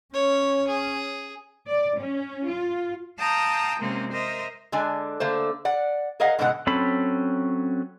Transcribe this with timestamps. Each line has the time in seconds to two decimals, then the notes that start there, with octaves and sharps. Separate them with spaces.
0.14 C#4 C#5
0.68 G#4
1.66 D5
1.99 C#4
2.49 F4
3.19 F5 G5 A5 A#5 D#6 G6
3.79 C3 G#3 A#3 C4 C#4
4.12 A#4 C5 D#5 E5
4.72 D3 G#3 D4 G#5
5.20 D3 A3 A#3 C5
5.65 D5 F#5
6.20 G#4 A#4 D#5 F5 F#5
6.39 G#2 B2 D3 G#3 G4 F#5
6.67 F#3 C4 C#4 A4 B5